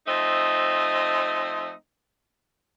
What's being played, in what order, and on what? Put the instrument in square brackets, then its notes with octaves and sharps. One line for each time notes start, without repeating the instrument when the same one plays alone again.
[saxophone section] F3 A3 C4 D#4 D#5